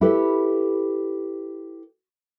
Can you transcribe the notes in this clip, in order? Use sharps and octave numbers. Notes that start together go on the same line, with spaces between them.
E4 G4 A4 B4